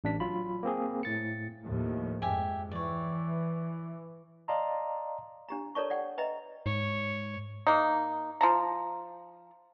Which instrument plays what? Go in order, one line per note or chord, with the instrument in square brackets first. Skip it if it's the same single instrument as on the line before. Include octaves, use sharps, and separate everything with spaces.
[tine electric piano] A1 D4 B6
F#3 F4 B5
A#3 C4 G#4
A2 A6 C#7
[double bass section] D#2 A2 F3
[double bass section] F2 G#2 [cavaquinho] G4 E5 G#5
[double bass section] E3 [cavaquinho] C#5 D5
[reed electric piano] D5 D#5 F5 A5 A#5 C6
[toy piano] D4 G4 A#5
A4 A#4 C#5 D5 A5 C#6
D5 F#5 G5
B4 D#5 E5 G5 A#5
[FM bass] G#2 [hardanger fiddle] C#5
[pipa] A#3 D#4
F3 A5 A#5